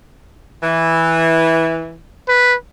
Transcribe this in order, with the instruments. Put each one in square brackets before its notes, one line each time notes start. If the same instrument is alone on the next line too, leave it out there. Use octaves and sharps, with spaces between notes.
[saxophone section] E3
[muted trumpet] B4